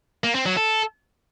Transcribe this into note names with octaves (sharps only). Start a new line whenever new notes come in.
A#3
C4
F#3
A4